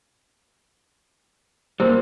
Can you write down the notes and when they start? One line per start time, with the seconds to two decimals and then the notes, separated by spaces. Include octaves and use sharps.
1.80 A#2 G3 E4 A#4 C5